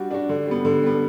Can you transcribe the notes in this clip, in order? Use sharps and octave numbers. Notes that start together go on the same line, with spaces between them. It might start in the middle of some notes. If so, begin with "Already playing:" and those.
Already playing: G3 D4 F#4
D4 F#4
D3
G3 B3
D3
G3 B3